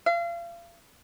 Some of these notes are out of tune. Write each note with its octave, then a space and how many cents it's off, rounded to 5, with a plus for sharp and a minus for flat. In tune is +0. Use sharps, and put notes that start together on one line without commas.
F5 -35